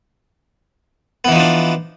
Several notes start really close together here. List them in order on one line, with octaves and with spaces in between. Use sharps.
B3 E3 D#4 F3 D4